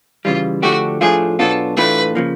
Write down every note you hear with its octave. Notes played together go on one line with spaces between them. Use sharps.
C#3 E3 G3 F4
D3 F3 A3 D4 F#4 G4
A2 F3 A3 D4 F4 G#4
B2 F#3 B3 D4 F4 A4
A2 E3 A3 D4 F4 B4
C#3 F3 A#3